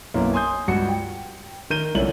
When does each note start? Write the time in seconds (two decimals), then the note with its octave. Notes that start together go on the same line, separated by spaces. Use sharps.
0.14 B1 F#2 A#3 B3 E4
0.33 G#5 C6 D#6 G6
0.68 C#2 G2 F#4 C#7
0.89 G5
1.70 D#3 A#4 G6 D#7 G7
1.95 C2 D3 F3 C#4 E4 F#7